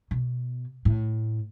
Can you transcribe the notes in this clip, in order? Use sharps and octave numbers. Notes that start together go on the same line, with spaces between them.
B2
A2